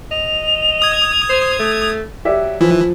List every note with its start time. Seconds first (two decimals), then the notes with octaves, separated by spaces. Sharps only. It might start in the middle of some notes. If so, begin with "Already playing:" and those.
0.11 D#5 F7
0.82 D#6 G#6
1.29 C5
1.59 A3
2.25 F#3 G4 D5 E5
2.61 E3 F3